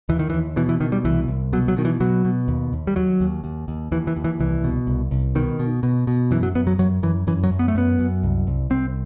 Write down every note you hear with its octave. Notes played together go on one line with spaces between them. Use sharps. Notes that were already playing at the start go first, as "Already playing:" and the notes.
D#2 E3
D#3
E3
D#2
B2 E3
E3
B2 D#3
G3
C2 E3
C2
B2 F#3
F#3
B2 D#3
E3
B2 F#3
B2
D#2
D#2
G3
D#2 F#3
D#2
D#2
D#2
D#2 E3
E3
D#2
E3
C2 E3
B2
C2
C2
B2 D#3
B2
B2
B2
F#2 E3
F#3
F#2 B3
F#3
F#2 F#3
F#2 E3
F#2 E3
F#3
F#2
B3
A3
F#2 B3
F#2
C2
C2
C2 C4